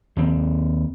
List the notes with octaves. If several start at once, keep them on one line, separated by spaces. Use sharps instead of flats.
D#2 C4